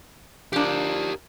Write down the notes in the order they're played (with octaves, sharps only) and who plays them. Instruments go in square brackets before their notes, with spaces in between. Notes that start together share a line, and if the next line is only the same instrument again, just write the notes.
[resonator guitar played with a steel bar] F3 D4 [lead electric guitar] G4 A#4